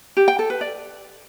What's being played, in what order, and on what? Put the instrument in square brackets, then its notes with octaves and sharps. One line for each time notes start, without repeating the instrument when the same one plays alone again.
[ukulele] G4
G5
A4
B4
D5